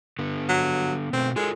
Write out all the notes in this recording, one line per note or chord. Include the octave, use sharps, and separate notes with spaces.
D3 B3
F#3
B2 A3 C4
G#3 F4 A4 A#4